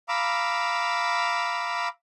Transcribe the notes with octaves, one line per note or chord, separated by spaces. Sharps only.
F5 A#5 B5 D6 E6